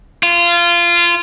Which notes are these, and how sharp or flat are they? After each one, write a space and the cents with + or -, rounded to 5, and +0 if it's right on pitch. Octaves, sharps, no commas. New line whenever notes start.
F4 -20